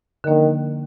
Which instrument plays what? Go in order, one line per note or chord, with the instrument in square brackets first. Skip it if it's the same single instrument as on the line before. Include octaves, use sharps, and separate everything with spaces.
[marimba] D3 F3 A#3 D4 [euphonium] D#3